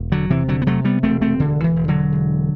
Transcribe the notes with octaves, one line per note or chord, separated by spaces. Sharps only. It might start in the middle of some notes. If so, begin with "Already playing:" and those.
Already playing: E1
D3 F#3
C3 E3
D3 F#3
B3
C3 F#3 A3
G3 B3
E1 A3 C4
A3 C4
D2 D3
E3
E1
D3 F#3
E1